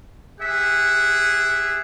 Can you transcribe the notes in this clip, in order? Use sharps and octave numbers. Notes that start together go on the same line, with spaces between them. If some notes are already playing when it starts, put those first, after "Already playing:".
G4 G#4 E5 F#5